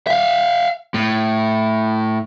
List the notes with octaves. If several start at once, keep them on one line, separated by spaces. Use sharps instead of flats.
E5 F5
A2